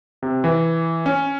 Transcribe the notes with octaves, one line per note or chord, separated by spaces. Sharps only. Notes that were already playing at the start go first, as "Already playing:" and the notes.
C3
E3
C#4